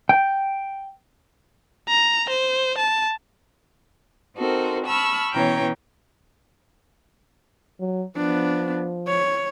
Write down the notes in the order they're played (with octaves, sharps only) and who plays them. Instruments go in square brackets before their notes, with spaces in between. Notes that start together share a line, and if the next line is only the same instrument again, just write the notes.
[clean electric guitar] G5
[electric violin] A#5
C5
A5
[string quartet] C4 D#4 F#4 A4 A#4 C5
A5 B5 C#6 E6 F6
B2 E3 C#4 C#5 G5 A#5
[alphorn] F#3
[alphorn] F3 [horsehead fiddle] B3 D4
[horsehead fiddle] C#5